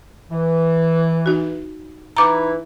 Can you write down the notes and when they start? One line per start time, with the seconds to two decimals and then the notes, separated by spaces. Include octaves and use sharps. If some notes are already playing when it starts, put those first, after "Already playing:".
0.30 E3
1.26 D#4 F#4
2.17 E3 D#4 E4 A#5 D6